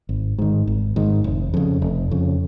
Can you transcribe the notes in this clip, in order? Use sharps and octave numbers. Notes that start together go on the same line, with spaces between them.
G#1
G#2 D#3
G#1
G#2 D#3
F1
F2 C#3
F1
F2 C#3